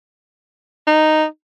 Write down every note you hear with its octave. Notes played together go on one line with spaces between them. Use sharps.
D#4